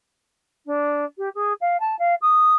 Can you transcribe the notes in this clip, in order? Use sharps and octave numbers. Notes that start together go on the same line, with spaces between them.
D4
G4
G#4
F5
A5
F5
D#6